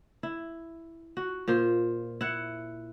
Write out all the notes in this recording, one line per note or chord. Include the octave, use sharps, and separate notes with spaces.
E4
F#4
A#2 F4 C5
E4 F#5